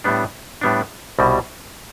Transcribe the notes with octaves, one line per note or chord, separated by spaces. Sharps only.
A2 G3 B3 D4
A2 G3 B3 D4
C2 B2 G3